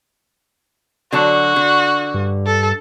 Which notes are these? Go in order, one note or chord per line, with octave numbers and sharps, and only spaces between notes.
D3 F#3 F#4 A5
D3
G2
A4